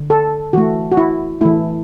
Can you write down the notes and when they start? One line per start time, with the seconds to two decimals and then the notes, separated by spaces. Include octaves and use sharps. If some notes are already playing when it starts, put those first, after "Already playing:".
Already playing: D3
0.10 A4
0.53 E3 A3 F#4
0.92 F#4
0.97 E4
1.41 E3 A3 E4